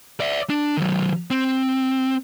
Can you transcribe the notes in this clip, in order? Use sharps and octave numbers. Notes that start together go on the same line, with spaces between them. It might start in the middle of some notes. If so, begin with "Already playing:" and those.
D5 E5
D4
D#3 F#3
C4